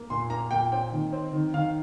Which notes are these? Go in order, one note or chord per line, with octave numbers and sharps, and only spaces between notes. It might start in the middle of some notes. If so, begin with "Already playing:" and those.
Already playing: A#3
A#2 C6
A#3 A#5
A#2 G5
C4 G5
D#3
C4
D#3
D#3 F5